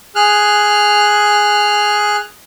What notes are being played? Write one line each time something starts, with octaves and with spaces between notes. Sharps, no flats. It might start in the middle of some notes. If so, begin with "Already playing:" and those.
G#4 F6 F#6